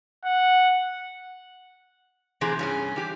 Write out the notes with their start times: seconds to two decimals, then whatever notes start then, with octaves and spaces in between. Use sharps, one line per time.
0.25 F#5
2.41 A2 C3 E3 C4 G4 G#4
2.59 G2 C#4 G#4
2.96 E3 G4